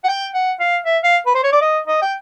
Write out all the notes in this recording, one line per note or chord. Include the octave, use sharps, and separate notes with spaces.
F#5
G5
F#5
F5
E5
F5
B4
C5
C#5
D5
D#5
D#5
G5